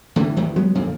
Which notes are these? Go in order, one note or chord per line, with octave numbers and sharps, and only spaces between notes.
A2 D3 E3
E2 A2 D#3 E3
F#3 G#3 B3
F2 A#2 D3 A#3